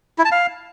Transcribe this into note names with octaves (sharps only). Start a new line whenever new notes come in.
E4
A5
F5